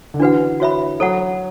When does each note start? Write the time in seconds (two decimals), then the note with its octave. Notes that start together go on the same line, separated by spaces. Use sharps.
0.14 D3
0.20 E3 D4 F#4 B4 F#5
0.60 F#4 C#5 E5 B5
1.00 F#3 A4 C#5 F#5